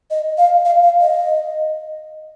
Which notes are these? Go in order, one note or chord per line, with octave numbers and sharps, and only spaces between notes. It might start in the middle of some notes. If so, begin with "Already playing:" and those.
D#5
F5
F5
F5
D#5